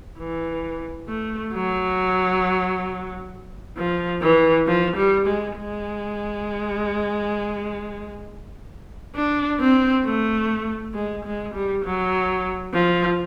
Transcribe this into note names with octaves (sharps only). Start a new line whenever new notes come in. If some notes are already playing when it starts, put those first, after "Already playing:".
E3
A3
F#3
F3
E3
F3
G3
G#3
G#3
D4
C4
A3
G#3
G#3
G3
F#3
F3